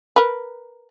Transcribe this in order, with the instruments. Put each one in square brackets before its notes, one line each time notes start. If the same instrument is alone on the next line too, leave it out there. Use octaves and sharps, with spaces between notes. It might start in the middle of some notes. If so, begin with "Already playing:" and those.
[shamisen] A#4 B4